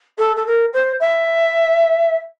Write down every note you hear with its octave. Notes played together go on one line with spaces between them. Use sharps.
A4
A4
A#4
C5
E5